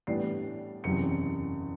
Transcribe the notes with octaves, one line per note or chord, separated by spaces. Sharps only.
A2 E3 G3 B3 D4 C7
F#1 E2 C3 C#7